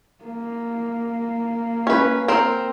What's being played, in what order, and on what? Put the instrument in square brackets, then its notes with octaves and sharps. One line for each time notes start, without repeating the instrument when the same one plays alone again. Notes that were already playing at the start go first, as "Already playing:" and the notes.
[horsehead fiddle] A#3
[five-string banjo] C#4 B4
C4 A#4